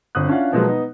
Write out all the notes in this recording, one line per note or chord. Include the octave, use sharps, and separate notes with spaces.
G1 C4 D#6 F#6
C#4 D4 E4 F4 F5 F#5
B2 F3 F#3 G#3 A#3 B3
B3 D#4